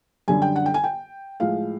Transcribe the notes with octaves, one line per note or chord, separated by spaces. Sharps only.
F#2 D3 G3 G#5
G5
F#5
G5
G#5
G5
A2 F3 G#3 F5